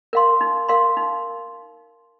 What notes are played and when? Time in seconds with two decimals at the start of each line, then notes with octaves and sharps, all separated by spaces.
0.13 A#4 F5 C6
0.41 D#4
0.68 A#4 F5 C6
0.97 D#4